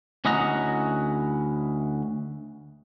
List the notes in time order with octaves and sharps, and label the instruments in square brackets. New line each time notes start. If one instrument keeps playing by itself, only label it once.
[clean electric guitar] D2 C#4 E4 D#5 F#5 A#5